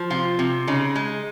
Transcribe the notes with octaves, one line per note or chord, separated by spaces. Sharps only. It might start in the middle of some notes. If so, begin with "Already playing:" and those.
Already playing: F3
C3 F4
C3
C#3 D#4
G#3